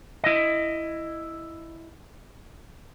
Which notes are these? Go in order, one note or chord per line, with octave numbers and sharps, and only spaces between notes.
E4 D#5